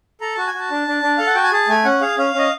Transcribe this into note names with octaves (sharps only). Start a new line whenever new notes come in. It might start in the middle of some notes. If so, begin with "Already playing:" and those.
A4 A#5
F#4 A5
G#5
F#4 A5
D4
D4
D4
A4 F5
F#5
F#4 G5
G#5
G#4 A5
A3 G#5
C#4 F#5
G#4 F5
C#4 F5
C#4 D#5